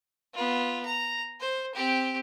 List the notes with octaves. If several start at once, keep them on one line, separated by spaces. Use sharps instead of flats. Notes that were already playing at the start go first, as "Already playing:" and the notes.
B3 F4
A#5
C5
C4 G4